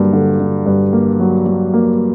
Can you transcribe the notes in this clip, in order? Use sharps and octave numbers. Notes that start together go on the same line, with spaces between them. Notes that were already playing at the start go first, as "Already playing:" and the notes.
Already playing: G2 D3 F#3 A#3
D3
D3
G2
A#3
F#3
F#3
A#3